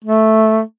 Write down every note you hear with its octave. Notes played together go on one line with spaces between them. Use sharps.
A3